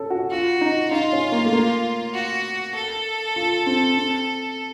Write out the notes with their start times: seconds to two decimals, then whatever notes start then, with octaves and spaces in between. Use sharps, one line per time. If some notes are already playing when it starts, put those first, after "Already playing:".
Already playing: C#4 A4
0.10 F#4
0.30 F4 F#4
0.61 D#4
0.91 D#4 F4
1.13 C#4
1.32 A#3
1.45 A3
1.53 A#3
2.13 F#4
2.75 A4
3.36 F4
3.66 C4
3.97 C4